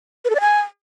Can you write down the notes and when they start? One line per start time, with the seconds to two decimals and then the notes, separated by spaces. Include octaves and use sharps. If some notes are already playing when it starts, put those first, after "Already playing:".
0.25 B4
0.30 A4
0.35 D5
0.40 G#5